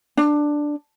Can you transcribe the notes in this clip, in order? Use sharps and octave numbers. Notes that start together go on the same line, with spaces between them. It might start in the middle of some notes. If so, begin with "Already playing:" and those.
D4